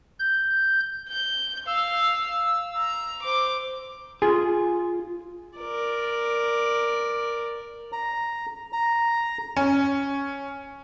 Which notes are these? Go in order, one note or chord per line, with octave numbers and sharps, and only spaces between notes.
G6
G6
F5 E6
A#5
C5 D6
F4 G#4
A#4 D5
A#5
A#5
C#4